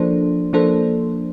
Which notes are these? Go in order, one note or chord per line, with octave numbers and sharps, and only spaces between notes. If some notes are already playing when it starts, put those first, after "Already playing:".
Already playing: F3 A#3 D4 A4 C5
F3 A#3 D4 A4 C5